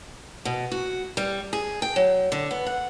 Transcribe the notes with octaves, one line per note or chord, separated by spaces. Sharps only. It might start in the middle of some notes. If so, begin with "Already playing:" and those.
B2
F#4
G3
G#4
G5
F#3
D3
B3
F#5